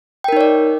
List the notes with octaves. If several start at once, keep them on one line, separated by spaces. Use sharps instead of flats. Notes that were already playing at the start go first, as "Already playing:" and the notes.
D#4 A#4 C#5 D5 G5